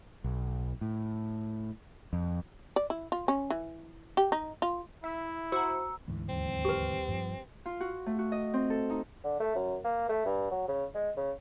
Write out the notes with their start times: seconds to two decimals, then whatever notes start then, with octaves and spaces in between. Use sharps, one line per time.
0.24 B1
0.81 A2
2.13 F2
2.76 D5
2.90 E4
3.12 F4
3.28 C#4
3.50 E3
4.17 G4
4.32 D#4
4.62 F4
5.04 E4 E5
5.52 F#4 C5 A#5 E6 C#7
6.08 D2 G#2 E3
6.29 D#2 F#3 C4
6.65 G4 B4
7.08 G2 F3
7.66 F4
7.80 F#4
8.06 A3
8.19 F#4
8.32 D#5
8.54 C4
8.70 A4
8.90 D#4
9.24 D3
9.40 A3
9.55 F#2
9.84 A#3
10.09 A3
10.26 G2
10.51 F#3
10.68 C#3
10.95 G#3
11.16 C#3